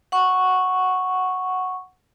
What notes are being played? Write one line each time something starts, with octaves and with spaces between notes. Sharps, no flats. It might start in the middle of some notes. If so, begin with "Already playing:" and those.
F#5 C#6